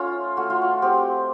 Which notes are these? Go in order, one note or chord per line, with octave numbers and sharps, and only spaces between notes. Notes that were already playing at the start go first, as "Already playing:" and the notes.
Already playing: A3 C#4 F4
A3 F#4
F4
F#4
C4 G4